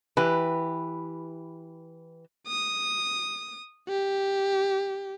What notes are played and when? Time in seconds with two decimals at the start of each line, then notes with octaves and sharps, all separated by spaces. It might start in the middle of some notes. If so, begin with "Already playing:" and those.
0.17 E3 G4 B4
2.47 D#6
3.89 G4